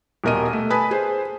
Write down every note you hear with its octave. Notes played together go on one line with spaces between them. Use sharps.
D#1 B2 A#4 D#5 D#7
A3
B4 G#5 A5 B5 D#6
G#4 C5